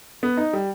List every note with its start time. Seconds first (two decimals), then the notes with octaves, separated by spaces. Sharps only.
0.23 B3
0.37 D#4
0.53 G3